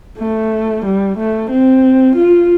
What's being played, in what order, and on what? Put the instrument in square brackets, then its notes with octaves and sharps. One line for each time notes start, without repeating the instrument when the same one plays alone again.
[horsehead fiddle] A3
G3
A3
C4
F4